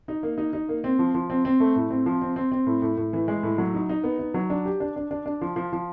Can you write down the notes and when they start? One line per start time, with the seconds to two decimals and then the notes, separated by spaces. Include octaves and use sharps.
0.08 D#4
0.23 A#3
0.38 D#4
0.53 D#4
0.69 A#3
0.84 C4
0.99 F3
1.15 F3
1.30 C4
1.45 C4
1.60 A3
1.76 A2
1.90 C4
2.06 F3
2.22 C4
2.36 C4
2.52 C4
2.67 A2
2.82 A2
2.97 A2
3.13 E3
3.28 G#3
3.43 A2
3.58 F#3
3.74 D#4
3.89 D#4
4.04 B3
4.19 D#4
4.34 F#3
4.50 D4
4.65 G4
4.80 D4
4.96 D4
5.11 D4
5.26 D4
5.41 F3
5.56 F3
5.73 F3